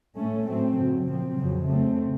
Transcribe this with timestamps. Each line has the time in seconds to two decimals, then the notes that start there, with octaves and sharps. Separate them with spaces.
0.16 A2 A3 C#4
0.46 A2 F#3 A3 C4
0.77 F#2 C#3 F#3
1.06 A#2 F3 C4
1.37 F2 C#3 F#3
1.67 C#3 A3 C4